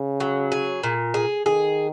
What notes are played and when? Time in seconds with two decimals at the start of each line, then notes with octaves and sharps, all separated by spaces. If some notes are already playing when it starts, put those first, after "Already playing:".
Already playing: C#3
0.20 F#3
0.52 G#4
0.83 A#2
1.14 G#4
1.46 D#3 G#4